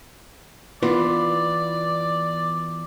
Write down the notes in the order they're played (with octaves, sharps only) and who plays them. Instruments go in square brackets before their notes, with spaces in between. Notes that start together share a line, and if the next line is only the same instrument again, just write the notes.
[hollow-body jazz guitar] E3 B3 F4 [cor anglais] D5